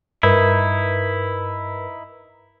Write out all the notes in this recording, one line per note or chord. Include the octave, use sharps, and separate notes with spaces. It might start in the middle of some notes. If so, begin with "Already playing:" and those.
G2 D#4 E4 A#4 B4